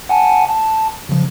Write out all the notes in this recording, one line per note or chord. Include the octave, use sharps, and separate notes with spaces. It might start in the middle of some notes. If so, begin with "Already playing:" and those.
F#5 G#5 A5
A5
C#3 F3